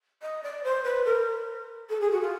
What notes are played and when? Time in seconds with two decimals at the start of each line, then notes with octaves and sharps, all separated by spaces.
0.22 D#5
0.43 D5
0.63 C5
0.83 B4
1.05 A#4
1.89 A4
2.00 G#4
2.10 F#4
2.21 F4